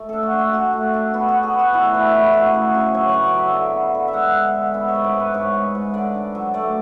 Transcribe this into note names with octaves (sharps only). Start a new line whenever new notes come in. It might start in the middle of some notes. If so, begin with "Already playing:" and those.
Already playing: A3
D4 A4
F#4
D4
F#4
A3 F#4
A3
D4
B3 F#4
F#4
B3
G#4
B3
F#4
A2 E4
E3
A2
A3 F#4
C#3
C#3
F#3 C#5
C#5
C#3
D5
F#3 E5
D3
B3
D3
E5
G#3 F#5
G#3
D3
B3 E5
C#5
G#2
D5
G#2
B4
G#2 C#5
G#3
G#2
D3 D5
D4
F#3
A3 D5